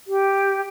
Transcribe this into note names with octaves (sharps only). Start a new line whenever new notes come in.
G4